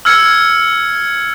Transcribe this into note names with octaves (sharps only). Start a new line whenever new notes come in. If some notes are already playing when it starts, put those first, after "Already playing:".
E6 F6 G#6 C#7